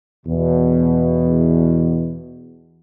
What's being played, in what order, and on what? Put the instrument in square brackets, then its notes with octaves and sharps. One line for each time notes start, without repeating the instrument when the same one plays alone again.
[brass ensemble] E2 B2